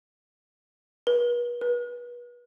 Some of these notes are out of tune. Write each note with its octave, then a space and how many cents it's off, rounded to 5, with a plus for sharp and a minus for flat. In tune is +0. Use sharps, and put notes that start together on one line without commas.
B4 -40
B4 -30